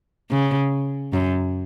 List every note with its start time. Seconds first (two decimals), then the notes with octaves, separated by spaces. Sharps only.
0.31 C#3
1.13 F#2